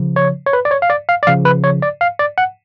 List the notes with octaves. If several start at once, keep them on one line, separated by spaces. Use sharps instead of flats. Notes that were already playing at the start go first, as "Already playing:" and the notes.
Already playing: C#3 F3
C#5
C#5
B4
D5
C#5
F5
D5
F5
D5
C#3 F3 F5
B4
C#5
D5
F5
D5
F#5